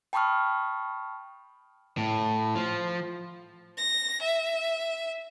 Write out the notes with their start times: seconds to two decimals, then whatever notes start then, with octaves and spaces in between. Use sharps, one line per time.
0.13 G5 A5 B5 C#6 D#6 F6
1.97 A2
2.55 F3
3.77 A#6
4.22 E5